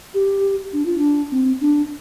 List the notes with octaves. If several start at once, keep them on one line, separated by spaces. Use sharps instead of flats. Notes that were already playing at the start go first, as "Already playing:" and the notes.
G4
D4
F4
D4
C4
D4